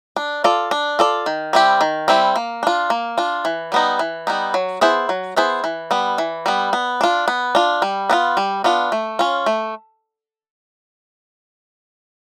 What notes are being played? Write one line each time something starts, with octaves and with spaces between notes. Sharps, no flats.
D4
F4 A4 D5
D4
F4 A4 D5
D#3
G3 C4 E4 G4
D#3
G3 C4 E4 G4
A#3
D4 F4
A#3
D4 F4
E3
G3 B3 D#4
E3
G3 B3 D#4
F#3
B3 E4 G#4 C5
F#3
B3 E4 G#4 C5
E3
G3 B3
E3
G3 B3
B3
D4 F4
B3
D4 F4
G3
B3 D4 F4
G3
B3 D4 F4
A3
C#4 F4
A3